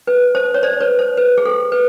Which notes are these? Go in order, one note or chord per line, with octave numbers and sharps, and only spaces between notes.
B4
C5
C#5
C5 D5
B4 C#5
C5
B4
G#4
A4
B4